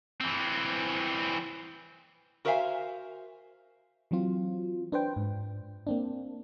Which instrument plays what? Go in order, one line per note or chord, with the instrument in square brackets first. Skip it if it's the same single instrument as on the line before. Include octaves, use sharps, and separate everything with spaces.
[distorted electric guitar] E3 C4
[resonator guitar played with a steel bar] F#4 A#4 C5 E5 F5 G#5
[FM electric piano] E3 F#3 C4 F4
D4 B4 C5 G5
G#2
A#3 C4 D4